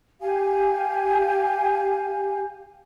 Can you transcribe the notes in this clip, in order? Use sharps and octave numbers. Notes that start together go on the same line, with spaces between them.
G4 F5 G#5